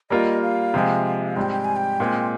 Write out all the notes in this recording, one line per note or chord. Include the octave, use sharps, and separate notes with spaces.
G3 A#3 F4 A#4 D#5
F5
C3 F3 G#3
G#2 G3 C4 G5
G5
G#5
G5
A#2 G#3 C4